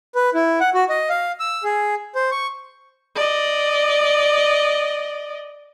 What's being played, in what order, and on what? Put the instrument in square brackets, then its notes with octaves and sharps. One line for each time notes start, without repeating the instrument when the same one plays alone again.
[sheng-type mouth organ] B4
E4
F#5
F#4
D#5
F5
E6
G#4
C5
C#6
[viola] D5 D#5